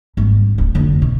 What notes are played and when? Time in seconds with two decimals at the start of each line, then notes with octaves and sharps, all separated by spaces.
0.17 G#1 G3
0.58 D1
0.75 F1 D3
1.02 B2